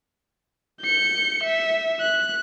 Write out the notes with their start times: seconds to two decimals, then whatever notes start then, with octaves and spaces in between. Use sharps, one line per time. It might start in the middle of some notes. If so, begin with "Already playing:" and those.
0.81 G6 C#7
1.44 E5
2.01 F#6